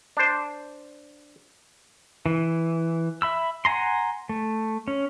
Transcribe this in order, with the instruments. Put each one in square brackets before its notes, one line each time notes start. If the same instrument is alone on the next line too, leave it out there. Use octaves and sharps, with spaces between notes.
[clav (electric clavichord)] D4 C5
[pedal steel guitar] E3
E5 B5 E6
F#5 G#5 A#5 C6
A3
C#4